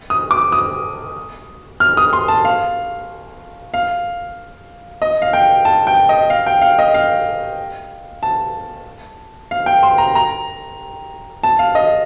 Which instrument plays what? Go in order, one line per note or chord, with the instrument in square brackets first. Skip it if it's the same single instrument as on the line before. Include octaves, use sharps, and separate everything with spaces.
[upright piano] D#6
D6
D#6
F6
D#6
C6
A5
F5
F5
D#5
F5
G5
A5
G5
D#5
F5
G5
F5
D#5
F5
A5
F5
G5
C6
A#5
A#5
A5
F5
D#5